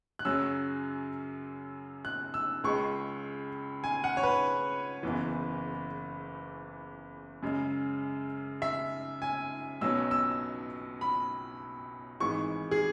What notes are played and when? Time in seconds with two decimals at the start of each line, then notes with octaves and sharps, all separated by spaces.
0.19 F#6
0.25 F#2 C#3 F#3 C#4 E6
2.05 F#6
2.34 E6
2.64 C#2 C#3 G#3 C#6
3.84 G#5
4.04 F#5
4.17 C#5
4.23 B4
5.03 F#1 E2 E3
7.43 F#2 C#3 G#3
8.62 E5
9.22 G#5
9.81 B1 B2 F#3 C#4 E6
10.11 E6
11.01 B5
12.20 G#1 G#2 E3 G#3 C#6
12.71 G#4